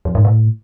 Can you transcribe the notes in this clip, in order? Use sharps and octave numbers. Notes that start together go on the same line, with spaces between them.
F2
G#2
A2